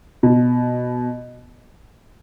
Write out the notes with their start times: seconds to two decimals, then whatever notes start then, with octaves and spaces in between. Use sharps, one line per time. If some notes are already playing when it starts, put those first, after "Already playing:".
0.23 B2